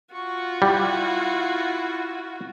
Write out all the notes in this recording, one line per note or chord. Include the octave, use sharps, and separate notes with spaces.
F4 F#4 C#6
G3 E4